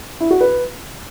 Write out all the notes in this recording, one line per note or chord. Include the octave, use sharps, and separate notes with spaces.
E4
F#4
B4